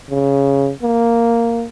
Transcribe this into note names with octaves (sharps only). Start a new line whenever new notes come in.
C#3
A#3